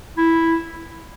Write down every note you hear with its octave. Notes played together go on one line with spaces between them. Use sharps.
E4